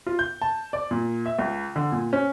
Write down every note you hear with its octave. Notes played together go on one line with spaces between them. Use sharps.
F4
G6
A5
D5
A#2
E5
C#2
D3
A#2
C#4